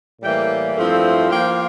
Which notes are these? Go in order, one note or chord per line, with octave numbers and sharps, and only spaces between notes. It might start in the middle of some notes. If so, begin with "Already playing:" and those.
A2 E3 G3 A#3 G5
G2 F3 A3 C4 E4
F3 A#3 F4 G5